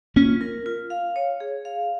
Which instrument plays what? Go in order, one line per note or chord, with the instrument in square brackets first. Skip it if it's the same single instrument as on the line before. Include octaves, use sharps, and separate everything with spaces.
[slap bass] A#3 C#4 [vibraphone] F4
[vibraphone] A#4
F4
F5
C#5
G#4
F5